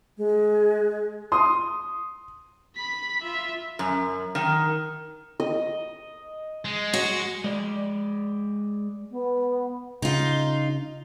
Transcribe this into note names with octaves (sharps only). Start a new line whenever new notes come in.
G#3
C6 D#6
B5 B6
F4 E5
F#2
D#3
D#5
G#3
F#4
G#3 D5
B3
C#3 D#4 F4